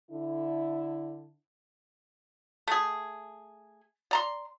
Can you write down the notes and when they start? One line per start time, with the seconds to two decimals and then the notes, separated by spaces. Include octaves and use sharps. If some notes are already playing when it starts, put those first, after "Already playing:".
0.10 D3 E4
2.68 A3 G#4
4.11 D5 A#5 C6